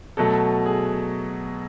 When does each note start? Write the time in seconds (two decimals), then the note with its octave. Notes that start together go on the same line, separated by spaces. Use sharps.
0.17 B2 F#3 A3 A4
0.66 G#4